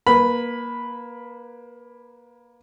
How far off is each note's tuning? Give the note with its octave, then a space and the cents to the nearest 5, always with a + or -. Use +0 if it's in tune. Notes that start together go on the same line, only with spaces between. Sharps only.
A#3 +20 B4 +0 B5 +0